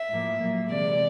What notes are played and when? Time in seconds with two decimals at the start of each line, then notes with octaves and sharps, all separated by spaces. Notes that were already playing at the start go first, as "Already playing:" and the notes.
Already playing: E5
0.10 A2 F3 A#3
0.40 A#2 F#3 A#3
0.70 C3 E3 G#3 D5